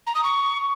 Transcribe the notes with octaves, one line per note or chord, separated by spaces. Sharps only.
A#5
D#6
C#6